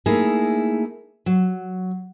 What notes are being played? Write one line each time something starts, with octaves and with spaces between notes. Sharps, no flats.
A3 A#3 D#4 E4 G#4
F#3